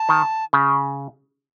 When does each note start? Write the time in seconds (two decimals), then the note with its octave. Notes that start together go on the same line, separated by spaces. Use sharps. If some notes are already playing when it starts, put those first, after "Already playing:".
Already playing: A5
0.09 D#3
0.53 C#3